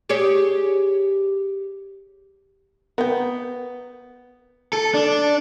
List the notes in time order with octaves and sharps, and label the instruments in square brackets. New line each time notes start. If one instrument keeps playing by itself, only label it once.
[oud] G4 G#4 C#5
[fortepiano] B3 [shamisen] A#4 G5
[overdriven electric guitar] A4
D4